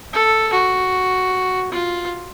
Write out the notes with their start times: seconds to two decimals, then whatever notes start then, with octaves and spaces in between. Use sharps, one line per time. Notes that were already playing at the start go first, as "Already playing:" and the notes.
0.13 A4
0.53 F#4
1.71 F4